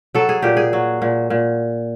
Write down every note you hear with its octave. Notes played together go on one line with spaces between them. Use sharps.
F#3 A4
G#4
A#2 G4
G#4
F#3
A#2
A#2